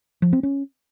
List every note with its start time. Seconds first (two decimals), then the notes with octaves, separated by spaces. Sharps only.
0.22 F3
0.33 C4
0.43 C#4